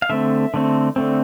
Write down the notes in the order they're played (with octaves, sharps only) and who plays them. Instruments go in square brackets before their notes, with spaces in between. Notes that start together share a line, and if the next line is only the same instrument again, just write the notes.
[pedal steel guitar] F5
D3 A3 C4 E5
D3 A3 C4
D3 A3 C4